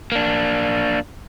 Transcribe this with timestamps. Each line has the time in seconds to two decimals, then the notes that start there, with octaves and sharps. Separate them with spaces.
0.12 A#3 D4